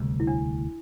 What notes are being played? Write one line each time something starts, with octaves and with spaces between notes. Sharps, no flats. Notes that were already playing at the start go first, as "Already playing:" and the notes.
Already playing: E1 D2 C3 G3
E4
D4